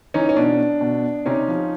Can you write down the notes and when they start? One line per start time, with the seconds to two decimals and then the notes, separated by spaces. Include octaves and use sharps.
0.14 E3 C#4 D#4
0.29 C#4
0.37 B2 D4
0.81 B2
1.26 C3 C#4 D#4
1.48 F3